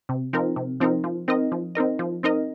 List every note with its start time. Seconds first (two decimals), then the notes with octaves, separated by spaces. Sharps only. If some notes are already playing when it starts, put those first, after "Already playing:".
0.09 C3
0.33 F3 C4 D#4 A#4
0.56 C3
0.80 F3 C4 D#4 A#4
1.04 F3
1.28 C4 D#4 A#4 D#5
1.52 F3
1.75 C4 D#4 A#4 D#5
1.99 F3
2.23 C4 D#4 A#4 D#5